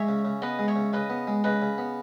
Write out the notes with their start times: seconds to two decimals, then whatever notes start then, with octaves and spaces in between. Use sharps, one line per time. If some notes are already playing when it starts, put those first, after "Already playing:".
Already playing: G#3 C#5 E5
0.08 C#3
0.25 C#3
0.42 B3 B4 D#5
0.59 G#3
0.68 C#5 E5
0.76 C#3
0.93 C#3 B4 D#5
1.10 B3
1.27 G#3
1.44 C#3 B4 D#5
1.62 C#3
1.78 B3